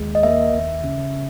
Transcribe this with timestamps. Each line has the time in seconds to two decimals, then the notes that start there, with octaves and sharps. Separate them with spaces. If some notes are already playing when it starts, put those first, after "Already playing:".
Already playing: D#2 G#3
0.15 D#5
0.23 A#3 E5
0.54 D#2
0.84 C#3